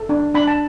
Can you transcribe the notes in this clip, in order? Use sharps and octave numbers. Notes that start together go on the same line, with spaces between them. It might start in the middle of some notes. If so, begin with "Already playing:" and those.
Already playing: A4
D4
D4 B5
A5